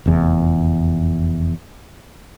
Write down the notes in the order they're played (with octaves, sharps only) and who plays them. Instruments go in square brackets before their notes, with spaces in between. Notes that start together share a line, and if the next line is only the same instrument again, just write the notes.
[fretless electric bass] F1 E2